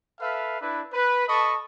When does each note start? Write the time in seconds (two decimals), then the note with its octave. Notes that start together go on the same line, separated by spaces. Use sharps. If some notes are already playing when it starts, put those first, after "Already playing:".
0.20 A4 B4 E5 F5
0.61 D4 E4 B4
0.93 B4
1.28 A4 D#5 A5 B5 C#6